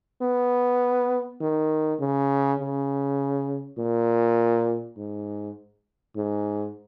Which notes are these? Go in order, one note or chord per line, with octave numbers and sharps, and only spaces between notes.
B3
D#3
C#3
C#3
A#2
G#2
G#2